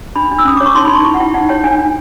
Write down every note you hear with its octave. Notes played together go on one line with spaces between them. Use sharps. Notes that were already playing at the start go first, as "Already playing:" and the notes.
D4 B5
D4
E6
C#4 D#6
C#5 D6
C#6
D#4 C6
B5
D#4 C#6
E4 C#6
F#5
E4 G5
D#4 F#5
C#5 G5
D4 G#5
D4